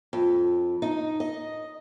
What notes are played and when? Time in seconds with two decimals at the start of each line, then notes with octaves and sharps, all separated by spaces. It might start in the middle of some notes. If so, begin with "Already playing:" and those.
0.13 F2
0.82 D#4
1.20 D#5